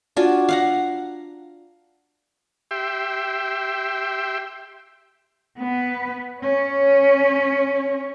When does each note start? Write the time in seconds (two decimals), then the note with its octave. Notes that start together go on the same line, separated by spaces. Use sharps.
0.17 D4 F4 F#4 G#5
0.49 F5 F#5 A#5
2.71 G4 E5 G5 C6
5.57 B3 B4
6.41 C#4 C#5